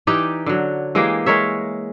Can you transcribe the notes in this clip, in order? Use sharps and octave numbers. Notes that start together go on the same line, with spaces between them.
E3 D#4 G4 D5
D3 F#3
E3 G#3 A#3 G4
G#3 A#4 C#5 E5